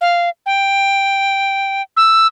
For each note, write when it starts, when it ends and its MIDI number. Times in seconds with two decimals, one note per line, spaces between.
0.01 0.29 77
0.46 1.82 79
1.97 2.27 88